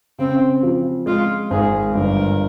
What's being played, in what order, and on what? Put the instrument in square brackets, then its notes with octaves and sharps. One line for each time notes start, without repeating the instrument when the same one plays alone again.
[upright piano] C#3 [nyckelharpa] C4
[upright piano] F3
[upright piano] G#3 [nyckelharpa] F4
[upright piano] G#1 [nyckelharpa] G#4
[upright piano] G1 [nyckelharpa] A#4